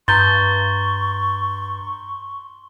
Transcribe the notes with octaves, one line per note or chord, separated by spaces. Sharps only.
G2 A#5 C6 C#6 G6 A6 G7